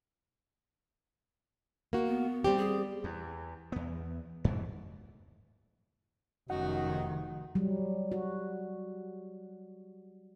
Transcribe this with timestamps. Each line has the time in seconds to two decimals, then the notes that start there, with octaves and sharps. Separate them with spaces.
1.93 A#3 F#4
2.07 B3
2.44 G3 C4 G4
2.57 G#4
3.04 E2
3.72 E2 B3
4.44 F2 G#2 B2 E3
6.50 F1 F#2 D#3 D#4 F#4 F#5
7.55 F#3 G3
8.12 F#4